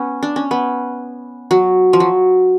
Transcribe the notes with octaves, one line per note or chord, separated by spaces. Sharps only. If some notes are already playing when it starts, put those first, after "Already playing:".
Already playing: B3 C#4
D4
C#4
B3
F#3
F3
F#3